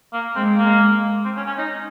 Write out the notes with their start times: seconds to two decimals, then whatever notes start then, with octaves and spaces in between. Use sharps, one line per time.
0.13 A#3
0.35 G#3 C4
0.58 A#3
1.25 C4
1.36 C#4
1.46 C#4
1.58 D#4